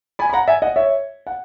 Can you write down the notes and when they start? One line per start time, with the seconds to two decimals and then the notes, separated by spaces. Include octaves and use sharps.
0.19 G#5 B5
0.29 B5
0.33 F#5 A#5
0.48 E5 G#5
0.62 D#5 F#5
0.76 C#5 E5
1.27 F#5